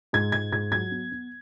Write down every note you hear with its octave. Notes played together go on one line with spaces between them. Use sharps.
G#2 G#6
G#2 G#6
G#2 G#6
F#3 G#6
B3
B3